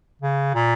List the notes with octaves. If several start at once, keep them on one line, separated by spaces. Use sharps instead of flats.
C#3
A#2